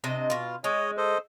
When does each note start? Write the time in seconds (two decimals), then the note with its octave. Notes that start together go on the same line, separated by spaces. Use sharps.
0.04 C3 D4 D#5
0.30 B2 F4
0.64 G#3 C#5 D#5
0.97 A4 C5 D#5